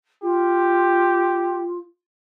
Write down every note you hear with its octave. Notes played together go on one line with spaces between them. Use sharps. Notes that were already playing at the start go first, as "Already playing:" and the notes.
F4 G4